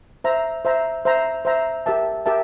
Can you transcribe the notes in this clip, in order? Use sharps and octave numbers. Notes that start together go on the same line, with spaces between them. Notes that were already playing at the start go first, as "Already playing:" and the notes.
C5 E5 A#5
C5 E5 A#5
C5 E5 A#5
C5 E5 A#5
G4 A#4 E5 A5
G4 A#4 E5 A5